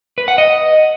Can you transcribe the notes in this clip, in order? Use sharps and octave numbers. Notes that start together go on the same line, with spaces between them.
B4
F#5
D#5